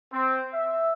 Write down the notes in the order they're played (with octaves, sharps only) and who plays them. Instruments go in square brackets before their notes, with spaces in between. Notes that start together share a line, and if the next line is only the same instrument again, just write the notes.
[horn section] C4
E5